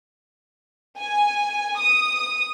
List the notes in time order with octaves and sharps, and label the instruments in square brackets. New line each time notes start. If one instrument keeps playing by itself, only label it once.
[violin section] G#5
D#6